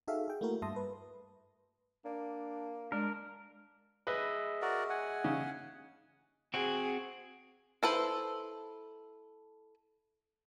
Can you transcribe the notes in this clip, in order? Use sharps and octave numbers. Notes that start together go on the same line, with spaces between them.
D#4 F#4 G#4 A4 E5 F5
G#4 G5
A3 A#3 E4 F#4 A#4
G2 E5 A5 C6 D#6 A#6
B4
A#3 D4
G#3 D4 A#4
G#4 B4 D#5 E5
F#4 A#4 D5
F#5 G#5
C#3
C4 F#4 G#4
E4 A4 B4 C5